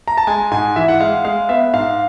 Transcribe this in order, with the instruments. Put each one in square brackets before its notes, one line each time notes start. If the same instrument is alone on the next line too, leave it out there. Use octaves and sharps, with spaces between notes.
[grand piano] A#5
A5
G#3 G#5
G#2 G#5
E3 E5
F#5
G#3 F5
G#3 F5
B3 E5
G#2 F5